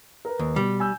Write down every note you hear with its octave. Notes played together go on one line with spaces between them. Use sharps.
A#4 B4
D#2
B2 G3
G#5 E6 G6